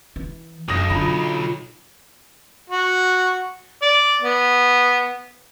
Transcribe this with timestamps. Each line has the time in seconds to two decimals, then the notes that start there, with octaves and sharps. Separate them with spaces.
0.16 E3
0.68 B1 F#2 D#6 A#6
0.90 D3 F4 A#5 B5
2.70 F#4
3.82 D5
4.22 B3